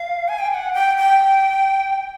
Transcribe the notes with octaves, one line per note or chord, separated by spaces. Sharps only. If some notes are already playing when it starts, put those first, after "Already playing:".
Already playing: F5
G#5
G5
G5
F#5
G5
G5